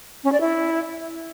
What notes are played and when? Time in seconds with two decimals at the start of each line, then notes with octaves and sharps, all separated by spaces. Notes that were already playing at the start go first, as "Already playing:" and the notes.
0.24 C#4
0.32 D5
0.41 E4